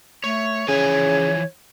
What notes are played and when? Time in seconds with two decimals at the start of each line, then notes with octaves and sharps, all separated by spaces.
0.24 A3 C#5
0.68 C#3 E3 F3 C#5 G#5